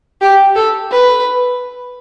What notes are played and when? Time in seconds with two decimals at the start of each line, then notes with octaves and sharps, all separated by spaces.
0.21 G4
0.55 A4
0.91 B4